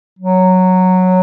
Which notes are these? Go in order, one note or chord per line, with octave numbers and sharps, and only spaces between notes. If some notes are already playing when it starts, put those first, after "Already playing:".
F#3